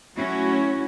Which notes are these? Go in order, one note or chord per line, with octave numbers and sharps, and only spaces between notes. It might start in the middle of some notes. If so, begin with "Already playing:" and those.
F#3 A3 C#4 E4 F#4